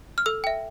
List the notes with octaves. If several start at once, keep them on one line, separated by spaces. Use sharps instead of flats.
F6
A4 E6
E5 G5